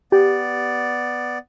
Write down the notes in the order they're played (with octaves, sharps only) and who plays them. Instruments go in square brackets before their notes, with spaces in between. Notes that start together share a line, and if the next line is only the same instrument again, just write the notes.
[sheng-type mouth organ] B3 D5 [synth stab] G4